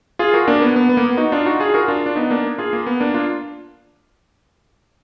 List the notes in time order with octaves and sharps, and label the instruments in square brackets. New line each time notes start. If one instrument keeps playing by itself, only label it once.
[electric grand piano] F4 G#4
F#4 A#4
A#3 D4
B3
B3
B3
A#3
B3
D#4 F#4
D4 F4
D#4 F#4
F4 G#4
F#4 A#4
D4 F4
D4
B3 D#4
A#3 D4
F4 G#4
A#3
B3
A#3 D4
D4 F4